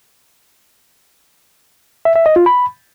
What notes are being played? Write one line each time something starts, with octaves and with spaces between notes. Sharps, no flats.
E5
E5
D#5
F4
B5